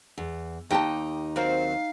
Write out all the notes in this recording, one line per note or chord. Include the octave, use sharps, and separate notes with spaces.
E2
D#2 D#4 G4 G5 A5
F#3 C4 A#4 F5